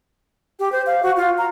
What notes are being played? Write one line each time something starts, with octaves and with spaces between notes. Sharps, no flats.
G4
C5
F5
F#4
F4
A#5